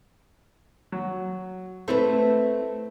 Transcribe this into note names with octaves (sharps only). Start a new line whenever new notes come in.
F#3
A3 C4 E4 B4 C5